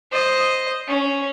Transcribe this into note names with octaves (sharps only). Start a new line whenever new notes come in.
C5 D#5
C#4